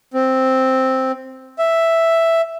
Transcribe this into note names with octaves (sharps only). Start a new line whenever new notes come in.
C4
E5